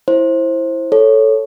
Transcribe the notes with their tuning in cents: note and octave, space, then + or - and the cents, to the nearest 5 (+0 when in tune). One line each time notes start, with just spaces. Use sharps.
E4 +0 C5 +20
A4 +0 C#5 +0